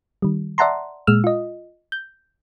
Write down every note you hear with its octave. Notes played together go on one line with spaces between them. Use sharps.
D#3 G3
D5 E5 F#5 A5 A#5 C6
A#2 G#3 E6 F6
F4 D#5
G6